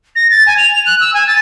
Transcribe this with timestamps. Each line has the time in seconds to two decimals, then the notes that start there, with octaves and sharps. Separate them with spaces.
0.15 A#6
0.31 A6
0.46 G#5
0.58 F7
0.73 F7
0.86 F#6
1.00 E6
1.14 G#5
1.27 A6